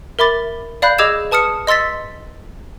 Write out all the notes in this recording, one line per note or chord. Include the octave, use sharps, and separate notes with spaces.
A#4 E5 B5 D6 A6
D5 F5 B5 F#6 G6
G#4 D#5 D6 E6 G#6 E7
B4 A5 D#6 F6 C#7
D#5 C6 E6 A6 B6